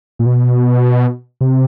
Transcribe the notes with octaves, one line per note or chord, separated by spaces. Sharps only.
A#2
B2
C3